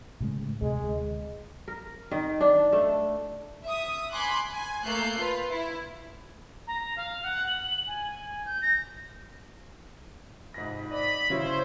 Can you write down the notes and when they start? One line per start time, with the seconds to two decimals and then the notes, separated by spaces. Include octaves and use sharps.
0.20 A2 C#3 G#3
0.62 D2 C3 G#3
1.68 A#4
2.11 D#3
2.40 D4
2.72 A3
3.63 E5 D#6
4.10 G#5 B5 C6 D6 F#6
4.52 G#5
4.83 A3 A#3 F#6 G6 C7
5.18 F4 B4
5.49 E4
6.67 A#5
6.96 F5
7.23 F#5
7.46 F#7
7.87 G#5
8.46 G6
8.61 A#6
10.54 F2 G#2 C3 B5 A#6
10.90 D5 D#5 B5
11.30 C#3 E4 C5 C#5